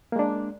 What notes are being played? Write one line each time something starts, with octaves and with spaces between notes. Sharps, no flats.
G#3 A#3 D4